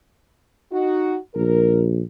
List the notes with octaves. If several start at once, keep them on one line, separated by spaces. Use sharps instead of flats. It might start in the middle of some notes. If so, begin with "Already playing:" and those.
D#4 F#4
A#1 A#4